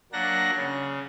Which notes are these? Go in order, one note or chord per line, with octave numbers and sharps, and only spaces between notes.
F#3 A#3 D4 F#5 A#6
C#3